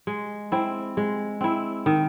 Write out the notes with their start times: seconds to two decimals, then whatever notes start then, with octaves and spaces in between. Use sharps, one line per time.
0.07 G#3
0.52 C4 E4
0.97 G#3
1.41 C4 E4
1.86 D#3